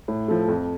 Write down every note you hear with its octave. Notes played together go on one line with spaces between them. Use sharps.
A2
F3 A3
F2